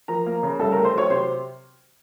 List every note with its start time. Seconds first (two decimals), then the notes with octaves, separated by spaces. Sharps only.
0.08 F3 A#4 A#5
0.26 A#3
0.43 C#3
0.59 C2 A4 A5
0.72 A3 A#4 A#5
0.84 C5 C6
0.94 F#3 C#5 C#6
1.10 C3 C5 C6